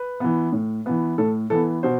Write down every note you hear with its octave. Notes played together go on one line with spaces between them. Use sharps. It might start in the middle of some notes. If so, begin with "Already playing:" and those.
Already playing: B4
E3 B3
A2
E3 B3
A2 A4
E3 B3 A4
B2 C5